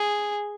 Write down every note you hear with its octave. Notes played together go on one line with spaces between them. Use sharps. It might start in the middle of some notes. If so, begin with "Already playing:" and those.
Already playing: G#4